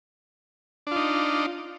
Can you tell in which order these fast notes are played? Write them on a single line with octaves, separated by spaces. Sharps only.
D4 F4 D#4